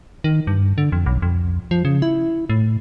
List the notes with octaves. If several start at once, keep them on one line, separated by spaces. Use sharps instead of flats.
D#3
G2
D3
F2
B1
F2
F3
C#3
E4
A2